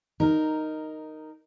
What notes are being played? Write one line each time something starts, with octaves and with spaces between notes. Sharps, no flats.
D#4 A#4